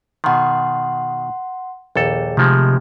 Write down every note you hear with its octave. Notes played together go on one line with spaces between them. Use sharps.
B2 D#3 F#5 C6
A#1 D#2 G#4 A4
C3 D#3 F3 G#3 A3